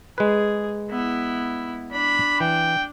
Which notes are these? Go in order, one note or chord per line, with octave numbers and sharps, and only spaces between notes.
G#3 G#4 B4
B3 E4
D4 B5
E3 G5